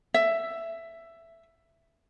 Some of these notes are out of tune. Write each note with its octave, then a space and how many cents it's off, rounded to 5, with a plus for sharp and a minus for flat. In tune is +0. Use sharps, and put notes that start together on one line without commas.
E5 +10